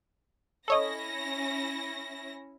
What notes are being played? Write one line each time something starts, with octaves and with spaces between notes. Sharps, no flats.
C#4 E4 A4 C#5 D#5 A#6